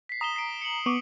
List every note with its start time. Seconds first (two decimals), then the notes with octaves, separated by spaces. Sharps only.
0.09 B6 C7
0.21 A#5 D#6 E7 G7
0.36 C7 D7
0.61 C#7 F#7
0.86 B3 C#6 D6